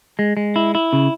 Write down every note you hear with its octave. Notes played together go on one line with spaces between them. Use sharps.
G#3
G#3
E4
E4
C#3